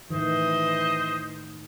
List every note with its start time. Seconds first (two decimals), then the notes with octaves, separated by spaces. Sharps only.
0.10 A2 D#3 E3 C5 D#5